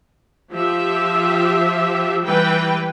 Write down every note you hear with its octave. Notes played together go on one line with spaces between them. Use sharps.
F3 G4 E5
E3 G3 B4 G5